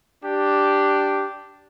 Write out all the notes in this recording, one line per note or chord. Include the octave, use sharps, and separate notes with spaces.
D4 G4